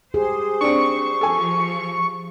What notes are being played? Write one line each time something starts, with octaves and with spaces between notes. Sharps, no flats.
G4 G#4 C5
C4 D4 C#6
F3 A4 G#5